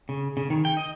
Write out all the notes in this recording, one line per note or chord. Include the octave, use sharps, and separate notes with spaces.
C#3
C#3
D#3
G5
D#5